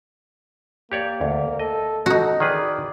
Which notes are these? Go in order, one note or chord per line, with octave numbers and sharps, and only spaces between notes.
A#3 G4 C#5 D5
D2
A4 D#5
D#4 F#4 A4
D#3 G#4 B4 D5